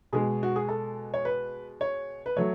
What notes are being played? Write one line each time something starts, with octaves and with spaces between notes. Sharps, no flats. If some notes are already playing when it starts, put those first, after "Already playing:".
B2 G#3 G#4
F#4
G#4
A4
C#5
B4
C#5
B4
F#3 A3 C#5